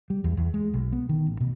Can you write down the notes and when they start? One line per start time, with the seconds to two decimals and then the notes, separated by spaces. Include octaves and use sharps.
0.10 G3
0.24 E2
0.37 E2
0.54 G#3
0.73 B1
0.92 B3
1.09 D#3
1.27 A1
1.40 B2